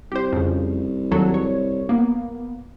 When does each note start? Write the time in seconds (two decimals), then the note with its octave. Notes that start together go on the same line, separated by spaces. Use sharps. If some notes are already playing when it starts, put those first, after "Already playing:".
0.12 C2 G4 C5
0.33 F2 C#3
1.11 D#2 F#3 A4
1.34 C#5
1.89 A#3 B3